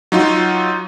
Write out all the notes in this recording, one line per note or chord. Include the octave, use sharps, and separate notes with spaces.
F#3 D#4 F4